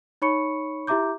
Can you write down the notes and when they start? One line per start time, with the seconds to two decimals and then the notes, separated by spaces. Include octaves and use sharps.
0.22 D#4 C#5 B5 C#6 C#7
0.87 E4 G4 E5 A#5 D6 G6